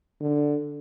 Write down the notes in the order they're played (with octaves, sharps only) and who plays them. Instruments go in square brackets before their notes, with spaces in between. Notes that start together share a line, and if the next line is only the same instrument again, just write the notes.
[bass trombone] D3